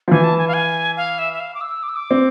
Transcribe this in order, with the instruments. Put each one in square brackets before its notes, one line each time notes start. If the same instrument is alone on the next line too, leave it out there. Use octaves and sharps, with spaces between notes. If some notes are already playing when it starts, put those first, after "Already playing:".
[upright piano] F3
[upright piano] E3 [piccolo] G#5
[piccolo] A5
G#5
F5
G#5
F5
E5
E5
F5
D6
E6
D6
E6
D6
[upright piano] C4